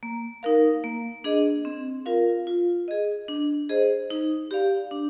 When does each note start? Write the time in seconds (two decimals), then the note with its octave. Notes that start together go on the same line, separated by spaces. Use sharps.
0.03 A#3
0.43 D#4 A#4 F5
0.84 A#3
1.24 D4 G#4 D#5
1.65 C4
2.06 F4 A#4 F5
2.47 F4
2.88 G#4 D#5
3.28 D4
3.69 G#4 C5 D#5
4.11 D#4
4.51 G4 D5 F5
4.91 D4